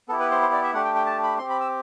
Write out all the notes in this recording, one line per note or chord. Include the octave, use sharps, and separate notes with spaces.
B3 E4 G4 A4
B4
C5
C5
D5
E5
A3 D4 G4 F#5
G5
G5
A5
B5
C4 G4 C6
B5
E6